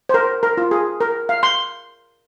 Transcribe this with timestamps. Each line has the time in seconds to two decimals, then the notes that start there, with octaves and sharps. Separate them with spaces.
0.09 C5
0.14 A#4
0.43 A#4
0.57 F4
0.71 G#4
1.01 A#4
1.29 F5
1.43 C6